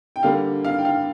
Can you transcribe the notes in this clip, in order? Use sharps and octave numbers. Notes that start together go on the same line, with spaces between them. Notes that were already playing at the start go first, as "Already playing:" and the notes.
G5
D3 G3 A#3 F5
F5
G5
F5